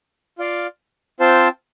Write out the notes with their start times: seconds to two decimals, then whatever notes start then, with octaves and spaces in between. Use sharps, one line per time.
0.38 F4 D5 F5
1.20 C4 F4 C5 A5